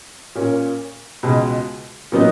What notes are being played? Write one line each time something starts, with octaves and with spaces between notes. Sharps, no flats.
A#2 A#3 C#4
C#2 B2 G#3
A#2 F#3 B3 D#4